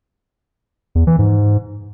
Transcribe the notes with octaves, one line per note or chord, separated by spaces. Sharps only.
E2
E3
G#2